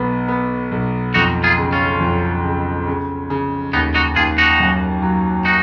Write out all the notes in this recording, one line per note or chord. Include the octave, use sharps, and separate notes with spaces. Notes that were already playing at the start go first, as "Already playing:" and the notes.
Already playing: B1 B3
B3
B1
F2 D#4 F#4
F4 G#4
C#3
C#4 F4
F2
C#3
C#3
C#3
D#2 B3 D#4
D#4 F#4
D#2 F4 G#4
D#4 F#4
F#2
F#3
D#4 F#4